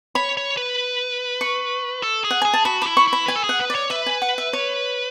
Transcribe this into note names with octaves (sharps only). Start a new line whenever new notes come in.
C#5 B5
C#5
B4
C#6
A4
G#4
F#5
G#4 G#5
A5
F#4 B5
D4 E4 B5
C#6
E4
B5
B4 G#5
A4
G#4
F#5
B4
D5
C#5
B4 E5
G#5
F#5
E5
C#5